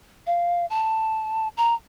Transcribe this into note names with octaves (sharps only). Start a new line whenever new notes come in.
F5
A5
A#5